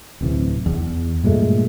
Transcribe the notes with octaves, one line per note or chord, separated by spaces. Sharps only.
D1 C3 E3
E2
G2 A#2 G#3 A3